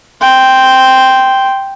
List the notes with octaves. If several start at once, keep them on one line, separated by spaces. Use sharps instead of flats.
G5 C6